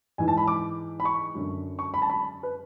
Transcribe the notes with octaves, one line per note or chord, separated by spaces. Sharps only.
G#2 E3 G#5
A5
B5
D6
B5
C#6
F#2 D3
C#6
B5
A5
B5
B4